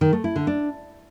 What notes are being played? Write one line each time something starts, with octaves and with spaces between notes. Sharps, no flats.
D#3
A3
E4
D3
D4